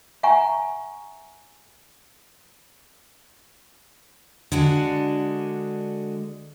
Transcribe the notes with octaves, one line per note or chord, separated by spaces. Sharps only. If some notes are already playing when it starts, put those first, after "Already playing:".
E5 F#5 G#5 A#5 C#6
D3 G#3 D4 F#4